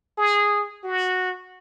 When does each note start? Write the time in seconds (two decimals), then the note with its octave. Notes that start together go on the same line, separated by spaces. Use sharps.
0.18 G#4
0.84 F#4